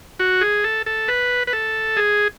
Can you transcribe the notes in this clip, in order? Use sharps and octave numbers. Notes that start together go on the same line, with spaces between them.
F#4
G#4
A4
A4
B4
B4
A4
G#4